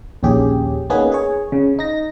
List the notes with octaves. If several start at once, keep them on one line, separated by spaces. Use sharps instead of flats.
A#1 D#2 C#4 G4 G#4
A#3 B3 C#4 D#4 G#4 B4
G#4 C#5
C#3
D#4 A#6